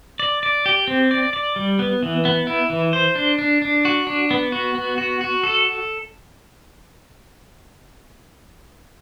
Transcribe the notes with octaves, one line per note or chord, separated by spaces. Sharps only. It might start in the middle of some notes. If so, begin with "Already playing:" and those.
D5
D5
G4
C4
D5
D5
G3
B3
E3
B3
E4
E3
C5
D4
D4
D4
F#4
D4
B3
F#4
B3
F#4
F#4
A4